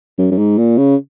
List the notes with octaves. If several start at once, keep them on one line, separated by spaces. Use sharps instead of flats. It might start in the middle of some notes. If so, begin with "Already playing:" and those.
F#2
F#2
G#2
A#2
C#3